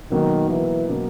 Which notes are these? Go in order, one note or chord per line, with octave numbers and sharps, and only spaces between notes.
B2 D#3 F#3 A#3
E3
B2 F#3 A#3